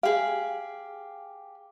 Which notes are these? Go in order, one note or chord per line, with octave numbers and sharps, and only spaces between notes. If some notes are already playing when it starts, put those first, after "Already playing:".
G4 G#4 F5